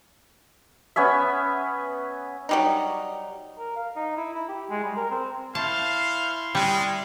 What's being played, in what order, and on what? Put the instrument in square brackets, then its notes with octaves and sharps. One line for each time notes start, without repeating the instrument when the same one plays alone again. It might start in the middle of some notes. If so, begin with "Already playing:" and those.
[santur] B3 C#4 C#5 E5
[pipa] F#3 G3 D#4
[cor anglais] A#4
F5
D#4
E4
E4
G4
G#3
G3
A#4
C4
[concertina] E4 C6 C#6 [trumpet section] C5 F5 [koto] A5
[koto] G3 [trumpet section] G#3